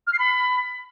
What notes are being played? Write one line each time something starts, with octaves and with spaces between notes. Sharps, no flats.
F6
C7
B5